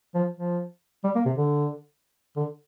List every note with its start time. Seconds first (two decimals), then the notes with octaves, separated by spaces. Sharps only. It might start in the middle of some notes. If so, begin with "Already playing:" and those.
0.15 F3
0.37 F3
1.04 G3
1.15 A#3
1.25 C3
1.37 D3
2.36 D3